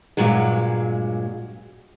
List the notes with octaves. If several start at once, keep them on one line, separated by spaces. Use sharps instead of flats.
G2 A#2 F#3 G#3